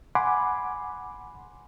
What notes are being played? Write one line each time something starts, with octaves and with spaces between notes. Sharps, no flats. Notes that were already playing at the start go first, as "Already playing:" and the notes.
F#5 G#5 B5 C6 D6